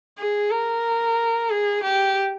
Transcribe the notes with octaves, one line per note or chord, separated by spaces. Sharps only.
G#4
A#4
G#4
G4